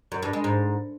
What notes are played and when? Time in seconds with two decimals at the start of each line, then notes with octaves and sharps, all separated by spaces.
0.12 F#2
0.22 G2
0.33 G#3
0.44 G#2